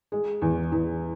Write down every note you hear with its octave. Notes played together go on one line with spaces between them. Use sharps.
G#3
E2
E2